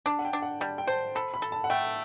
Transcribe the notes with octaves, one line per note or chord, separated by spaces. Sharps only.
D4 A5
F#5
G5
D4
F#5
G3 A5
G5
C5 A5
A4 B5
B5
A4
A5
F#5
A3 G5